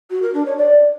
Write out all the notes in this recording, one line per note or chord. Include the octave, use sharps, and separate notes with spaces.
F#4
A#4
D4
C#5
D5